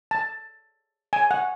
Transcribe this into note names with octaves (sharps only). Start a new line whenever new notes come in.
A5
G#5
F#5